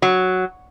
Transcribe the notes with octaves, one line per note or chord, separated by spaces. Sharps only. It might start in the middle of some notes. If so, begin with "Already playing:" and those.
F#3